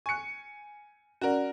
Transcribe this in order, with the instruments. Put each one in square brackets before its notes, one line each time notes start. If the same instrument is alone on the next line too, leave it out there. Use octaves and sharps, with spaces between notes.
[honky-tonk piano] G#5 C#7 [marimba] C#6 F#6
[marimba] C#4 D5 [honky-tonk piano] F#4 A#4